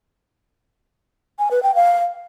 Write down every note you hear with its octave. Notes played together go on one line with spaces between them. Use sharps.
G#5
B4
G5
F5